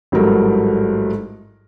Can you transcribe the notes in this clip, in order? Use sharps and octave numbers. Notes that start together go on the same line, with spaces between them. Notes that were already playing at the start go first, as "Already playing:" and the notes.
A1 G#2 F#3 G3 A3 A#4